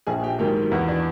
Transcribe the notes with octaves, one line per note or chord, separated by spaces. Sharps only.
A#1 G#4 G#5
G4 G5
G#2 D#3 F#3 G4 G5
E2 F#4 F#5
D4 D5